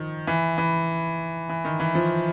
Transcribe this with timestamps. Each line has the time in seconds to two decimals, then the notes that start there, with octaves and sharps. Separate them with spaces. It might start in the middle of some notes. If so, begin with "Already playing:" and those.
Already playing: D#3 F3
0.27 E3
0.58 E3
1.49 E3
1.65 D#3
1.80 E3
1.95 F3